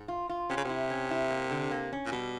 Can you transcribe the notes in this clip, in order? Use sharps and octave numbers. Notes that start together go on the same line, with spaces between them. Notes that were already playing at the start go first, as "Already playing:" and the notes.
Already playing: G#2
F4
F4
C3 C#4
C#3
C3 E4
C#4
E4
A#3
D3
A#3
C#4
A#2
B2 G3